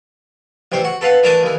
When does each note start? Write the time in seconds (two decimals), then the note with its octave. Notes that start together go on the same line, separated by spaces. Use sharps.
0.72 A1 C3 C4 C5
0.84 F#4
1.01 A4 B4 F5 F#5
1.23 E3 A3 D4 A#4 A5 D#6
1.43 D#2 E3